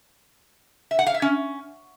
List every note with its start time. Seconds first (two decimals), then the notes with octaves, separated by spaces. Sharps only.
0.91 E5
0.99 F#5
1.07 F5
1.14 E5
1.22 C#4